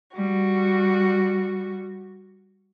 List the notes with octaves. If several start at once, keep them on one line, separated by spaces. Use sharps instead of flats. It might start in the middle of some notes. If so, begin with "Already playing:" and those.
G3 F#4